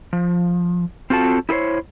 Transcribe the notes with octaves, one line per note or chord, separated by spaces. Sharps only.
F3
C4 F4 F#4 A4 A5
E4 G#4 A4 C5 C#5